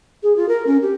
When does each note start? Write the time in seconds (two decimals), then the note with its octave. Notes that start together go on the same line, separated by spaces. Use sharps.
0.23 G#4
0.36 F4
0.48 A#4
0.66 C#4
0.82 G4